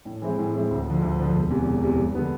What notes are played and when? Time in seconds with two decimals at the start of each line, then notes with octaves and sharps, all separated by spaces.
0.05 A2
0.22 E3 G#3 C4 E4
0.38 A2
0.54 E3 G#3 C4 E4
0.70 D2
0.86 D3 F3
1.02 D2
1.19 D3 F3
1.35 E1
1.50 E2 C3
1.66 E1
1.83 E2 C3
1.98 G2
2.15 D3 G3 B3